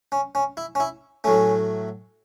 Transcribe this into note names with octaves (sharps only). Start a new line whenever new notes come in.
C#4
C#4
E4
C#4
E4
A2 F#3 A3 C#4